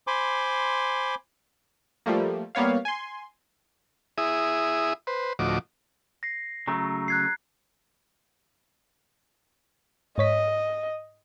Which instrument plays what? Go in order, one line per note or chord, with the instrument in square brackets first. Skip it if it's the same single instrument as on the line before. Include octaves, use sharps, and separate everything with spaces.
[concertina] C5 G#5 B5 C6 D6
[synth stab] F3 G3 A3 A#3
G3 A#3 B3 C#5 F5
G#5 C6
[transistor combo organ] E4 G#4 E5 D#6
B4 C5
D2 A2 F3 F#4 D#5 D6
[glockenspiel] A#6 C7
[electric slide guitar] C#3 F#3 A3 [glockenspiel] A#5
[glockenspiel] F#6 G#6 C7
[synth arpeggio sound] G#2 C#5 B6 [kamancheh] D#5